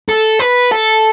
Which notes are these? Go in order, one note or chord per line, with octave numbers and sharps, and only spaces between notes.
A4
B4
A4